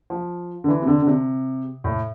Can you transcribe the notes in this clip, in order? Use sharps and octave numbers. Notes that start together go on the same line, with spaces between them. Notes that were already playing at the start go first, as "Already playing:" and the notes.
F3
D3
E3
C3
D3
D3
C3
A2